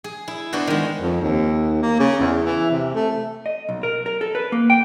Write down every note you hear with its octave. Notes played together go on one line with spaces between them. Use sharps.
G#4
E4
B3 D4 F#4 C5
D#3 G#3
F2
D#2
A#3
C#3
E2
E3
C3
A3
D#5
B1
A#4
A#4
A4
B4
A#3
G5